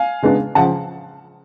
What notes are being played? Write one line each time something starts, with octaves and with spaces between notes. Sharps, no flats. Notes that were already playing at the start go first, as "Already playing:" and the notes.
Already playing: F5 G#5
C#3 G#3 B3 D4
C#3 F3 F#5 A5